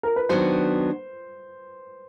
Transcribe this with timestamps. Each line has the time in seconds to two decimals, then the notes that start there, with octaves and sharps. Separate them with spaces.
0.03 A#4
0.16 B4
0.29 D#3 F#3 B3 D4 F#4 C5